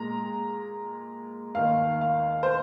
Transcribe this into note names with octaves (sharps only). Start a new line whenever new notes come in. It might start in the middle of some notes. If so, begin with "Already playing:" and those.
Already playing: A#2 G#3 A#5
D#2 D#3 A#3 F5
F5
C5